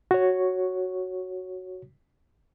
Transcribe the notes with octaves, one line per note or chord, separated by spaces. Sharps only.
F#4 C#5